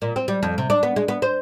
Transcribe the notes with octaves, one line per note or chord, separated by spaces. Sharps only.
A#2
C4
G3
F2
C3
D4
B3
G#3
B3
C5